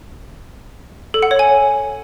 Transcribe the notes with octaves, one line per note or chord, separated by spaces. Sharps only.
A4
F#5
C#5
G#5